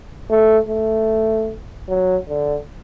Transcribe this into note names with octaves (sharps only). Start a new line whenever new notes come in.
A3
A3
F#3
D3